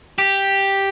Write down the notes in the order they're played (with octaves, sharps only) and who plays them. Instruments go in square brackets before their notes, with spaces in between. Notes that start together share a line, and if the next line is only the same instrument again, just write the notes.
[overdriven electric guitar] G4